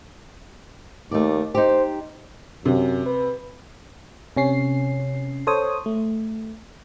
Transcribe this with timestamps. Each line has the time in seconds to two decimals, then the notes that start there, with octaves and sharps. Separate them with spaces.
1.11 D#2 A3 D5
1.55 D#4 G4 C5
2.66 F#2 C3
3.06 B4
4.36 C3 C#4 C7
5.47 A4 C5 C#5 D#6
5.86 A3